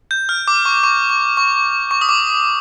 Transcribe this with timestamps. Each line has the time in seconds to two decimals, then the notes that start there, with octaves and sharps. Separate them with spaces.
0.11 G6
0.29 F6
0.48 D6
0.65 C#6
0.84 C#6
1.09 C#6
1.37 C#6
1.91 C#6
2.01 D#6
2.09 D6